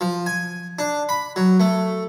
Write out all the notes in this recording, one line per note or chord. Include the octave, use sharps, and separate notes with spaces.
F3
G#5
D4
B5
F#3
A3